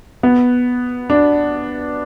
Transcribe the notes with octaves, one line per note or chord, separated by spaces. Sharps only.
B3
D4